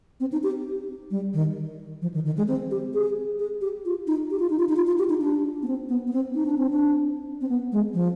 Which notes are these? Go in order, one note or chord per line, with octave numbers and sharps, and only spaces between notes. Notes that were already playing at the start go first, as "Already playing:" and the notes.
C4
D#4
G4
G3
D#3
F3
D#3
D#3
G#3
C4
G4
G#4
G#4
G4
F4
D#4
G4
F4
D#4
F4
D#4
F4
F4
G4
D#4
D4
B3
C4
B3
B3
C4
D#4
D4
C4
D4
C4
B3
G#3
F3